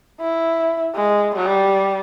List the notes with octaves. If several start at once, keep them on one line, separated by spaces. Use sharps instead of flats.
E4
G#3
G3